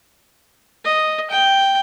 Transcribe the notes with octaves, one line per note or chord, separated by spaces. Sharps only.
D#5
G5